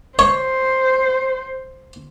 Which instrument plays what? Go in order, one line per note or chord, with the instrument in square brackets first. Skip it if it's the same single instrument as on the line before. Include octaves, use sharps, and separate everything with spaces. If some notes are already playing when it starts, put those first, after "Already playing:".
[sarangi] C5 [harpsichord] C#5